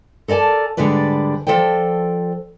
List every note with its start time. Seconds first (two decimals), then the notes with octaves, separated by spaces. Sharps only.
0.28 A4 A#4 D5 G#5 A5
0.77 G#2 D3 G3 G#3 B4 D5
1.47 F3 A4 C5 D5 G5